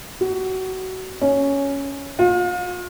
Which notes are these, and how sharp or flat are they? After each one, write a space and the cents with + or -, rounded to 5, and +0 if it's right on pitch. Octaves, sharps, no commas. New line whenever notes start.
F#4 +25
C#4 +5
F4 +40